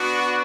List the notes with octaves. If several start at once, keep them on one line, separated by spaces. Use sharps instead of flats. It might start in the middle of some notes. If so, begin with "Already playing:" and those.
Already playing: B3 D4 F#4